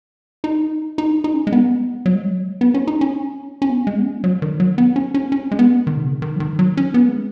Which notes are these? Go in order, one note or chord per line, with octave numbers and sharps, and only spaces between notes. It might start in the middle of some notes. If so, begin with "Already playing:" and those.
D#4
D#4
D#4
C#4
G#3
B3
F#3
G#3
F#3
B3
C#4
D#4
C#4
C#4
B3
G#3
B3
C#4
F#3
D#3
F#3
B3
C#4
C#4
C#4
G#3
B3
D#3
B2
C#3
D#3
F#3
D#3
F#3
C#4
B3
G#3